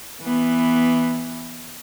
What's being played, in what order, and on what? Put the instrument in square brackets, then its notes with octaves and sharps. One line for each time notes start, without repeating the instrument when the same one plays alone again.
[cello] E3 B3